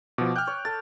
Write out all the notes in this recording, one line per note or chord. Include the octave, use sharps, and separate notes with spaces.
B2 F3 D6
G5 F6 F#6
C#5
A4 A6